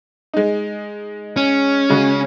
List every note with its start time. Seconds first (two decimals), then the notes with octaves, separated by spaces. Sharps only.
0.34 G#3 D#4
1.36 C#4
1.90 C#3 G#3 F#4